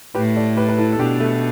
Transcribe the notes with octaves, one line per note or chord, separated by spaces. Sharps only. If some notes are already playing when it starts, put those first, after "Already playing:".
A2 G4 B4
A4 D5
G4 B4
B4
E4 A4
A4
B2 D4 G4
A3